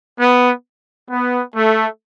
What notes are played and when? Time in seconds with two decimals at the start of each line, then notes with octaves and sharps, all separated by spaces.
0.18 B3
1.09 B3
1.54 A3